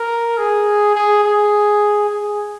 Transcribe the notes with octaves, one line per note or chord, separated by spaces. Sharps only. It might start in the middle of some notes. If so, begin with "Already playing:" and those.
Already playing: A#4
G#4
G#4
G#4
G#4